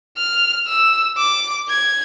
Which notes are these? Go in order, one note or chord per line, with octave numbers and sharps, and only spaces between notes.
F6
E6
D6
G#6